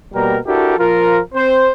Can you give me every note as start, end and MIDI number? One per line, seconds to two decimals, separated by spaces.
0.14 0.37 47
0.14 0.37 55
0.14 0.37 58
0.14 0.37 70
0.14 0.37 79
0.14 0.37 82
0.47 0.77 62
0.47 0.77 64
0.47 0.77 66
0.47 0.77 67
0.47 0.77 69
0.47 0.77 70
0.78 1.19 53
0.78 1.19 65
0.78 1.19 70
1.35 1.70 60
1.35 1.70 72